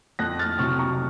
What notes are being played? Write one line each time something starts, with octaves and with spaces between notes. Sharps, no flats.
F2 F#6 A#6
F6 A6
C3 F#3 C#6 F6
A#5 C#6